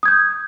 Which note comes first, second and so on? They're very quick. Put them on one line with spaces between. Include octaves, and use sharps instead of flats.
D#6 G#6 G6